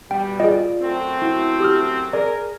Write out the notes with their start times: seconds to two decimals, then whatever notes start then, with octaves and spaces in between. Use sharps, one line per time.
0.11 B2 G3 G5
0.40 F4 G#4 D5 D#5
0.82 F#2 A3 C4
1.22 E4 F#4
1.60 G4 D#6 F6
2.13 G#4 A#4 D5